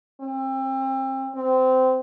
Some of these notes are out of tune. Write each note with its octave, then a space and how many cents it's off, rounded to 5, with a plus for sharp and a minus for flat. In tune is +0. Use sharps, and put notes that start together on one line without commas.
C4 +30
C4 -20